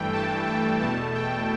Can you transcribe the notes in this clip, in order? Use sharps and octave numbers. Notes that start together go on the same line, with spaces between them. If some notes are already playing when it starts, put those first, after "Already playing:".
Already playing: G2 E3 A3 G5
A5
G5
E2 B2 A3 A5
G5